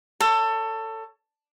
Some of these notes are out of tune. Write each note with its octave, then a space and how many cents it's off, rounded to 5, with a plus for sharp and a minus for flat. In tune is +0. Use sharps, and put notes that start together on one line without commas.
A4 +20 C#5 +15